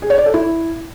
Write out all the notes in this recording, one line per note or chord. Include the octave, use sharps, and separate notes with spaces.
G#4
C#5
D5
A4
E4